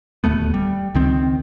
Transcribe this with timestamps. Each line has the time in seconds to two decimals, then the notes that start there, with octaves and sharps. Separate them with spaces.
0.24 D1 D#2 A3 B3
0.54 G3
0.95 C#2 D#3 C4